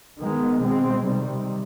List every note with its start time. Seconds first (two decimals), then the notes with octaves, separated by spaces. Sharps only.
0.19 D#3 G#3 B3
0.62 B2 G#3 C4
1.06 C3 D#3 G3